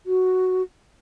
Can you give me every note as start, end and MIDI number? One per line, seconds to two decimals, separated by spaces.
0.06 0.62 66